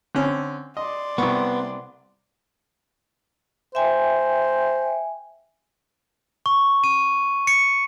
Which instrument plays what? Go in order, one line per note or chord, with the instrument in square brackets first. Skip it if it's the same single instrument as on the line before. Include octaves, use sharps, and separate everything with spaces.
[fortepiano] D3 C4 C#4
[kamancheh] D5 C6 [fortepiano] D#5
[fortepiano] C2 C#6 [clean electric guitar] B3
[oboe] C5 [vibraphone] E5 G5 G#5
[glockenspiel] C#6
D#7
C#7